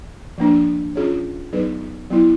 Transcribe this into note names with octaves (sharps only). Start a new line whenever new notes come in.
F3 A#3 D4
C#4 F4 G#4 C#5
F#3 B3 D#4 G#4 B4
F#3 B3 E4